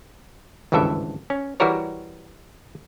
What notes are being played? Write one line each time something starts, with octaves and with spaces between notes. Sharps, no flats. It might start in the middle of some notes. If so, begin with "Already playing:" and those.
G#1 C#2 G2 E3 A4 E5
C#4
E3 G3 E4 F#4 A#4 C#5